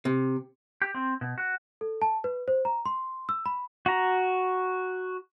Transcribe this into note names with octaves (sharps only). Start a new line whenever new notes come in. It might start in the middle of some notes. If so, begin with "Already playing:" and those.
C3
G4
C4
B2
F#4
A4
A5
B4
C5
A#5
C6
E6
B5
F#4 A#5